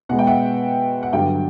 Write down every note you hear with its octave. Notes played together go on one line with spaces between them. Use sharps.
B2 G#3 B3 F#5
G5
E5 F#5
F#5
G2 D3 F#3 F5 G5